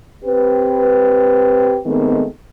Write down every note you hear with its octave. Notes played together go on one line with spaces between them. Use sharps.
C4 G4 B4
D#3 G#3 A3 B3 C4